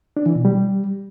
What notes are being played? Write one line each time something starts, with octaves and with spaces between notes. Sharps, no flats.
D4
E3
B2
G3